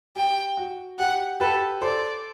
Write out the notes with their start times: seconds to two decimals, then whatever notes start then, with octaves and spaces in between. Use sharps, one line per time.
0.16 G4 G5
0.57 F#4
0.99 G4 F#5
1.40 G4 A4 B4
1.81 A4 C5 D5